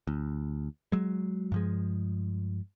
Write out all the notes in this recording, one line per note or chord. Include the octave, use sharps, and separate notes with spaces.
D2
F#3 G#3
G2 F3 G#3